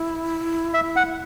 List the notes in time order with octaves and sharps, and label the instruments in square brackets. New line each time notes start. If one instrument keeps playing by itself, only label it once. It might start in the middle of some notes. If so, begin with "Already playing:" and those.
Already playing: [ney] E4
[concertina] E5
F#5